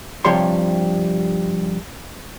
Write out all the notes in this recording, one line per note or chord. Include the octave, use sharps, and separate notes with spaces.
G2 C3 F3 G3 C#5 C6